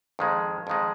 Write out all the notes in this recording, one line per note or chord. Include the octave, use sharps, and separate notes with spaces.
F2 D#3 G#3
F2 D#3 G#3